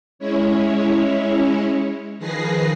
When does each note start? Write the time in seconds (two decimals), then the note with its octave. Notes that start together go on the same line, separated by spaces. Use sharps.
0.19 G#3 C#4 E4 C#5
2.18 D#3 F3 G#4 B4 A#6 C7